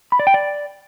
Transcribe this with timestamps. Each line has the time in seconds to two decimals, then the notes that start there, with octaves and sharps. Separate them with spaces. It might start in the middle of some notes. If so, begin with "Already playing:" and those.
0.12 B5
0.19 D5
0.27 G5
0.34 D5